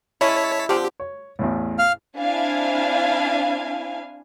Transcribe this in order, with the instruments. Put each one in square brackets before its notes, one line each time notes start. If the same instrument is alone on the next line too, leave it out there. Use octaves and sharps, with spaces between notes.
[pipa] G#3 C#4 E4 [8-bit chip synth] C#5 A5 B6
[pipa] D3 F3 C4 [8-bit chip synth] G4
[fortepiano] C#5
A1 E2 A2
[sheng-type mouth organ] F5 F6
[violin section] C4 D4 E4 F5 G#5